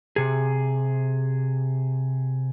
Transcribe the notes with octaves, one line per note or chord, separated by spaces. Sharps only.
C3 G#4